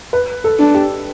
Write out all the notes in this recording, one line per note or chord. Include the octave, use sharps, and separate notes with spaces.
B4
A4
D4
G4